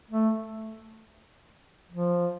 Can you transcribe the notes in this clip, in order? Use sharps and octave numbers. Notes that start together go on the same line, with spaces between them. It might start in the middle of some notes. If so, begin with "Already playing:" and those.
A3
F3